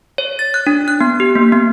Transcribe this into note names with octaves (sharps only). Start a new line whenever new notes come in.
C#5
A6
F#6
D4
F#6
B3
G4
A#3
B3